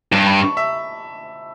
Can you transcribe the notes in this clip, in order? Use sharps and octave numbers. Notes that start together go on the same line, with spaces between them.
G2 A5
B5
C#6
E5